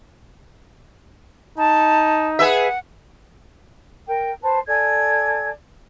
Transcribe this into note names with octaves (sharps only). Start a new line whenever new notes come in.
D#4 A5
G#4 B4 E5 F#5
A#4 G5
B4 C5 A5
A4 D5 G#5 G#6